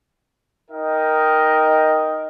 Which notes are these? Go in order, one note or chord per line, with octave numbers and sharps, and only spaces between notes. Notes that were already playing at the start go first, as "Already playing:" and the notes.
D#4 A#4 D#5 G5